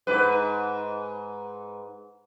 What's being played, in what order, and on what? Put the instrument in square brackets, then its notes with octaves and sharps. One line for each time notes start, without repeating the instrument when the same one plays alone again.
[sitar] G#2 B4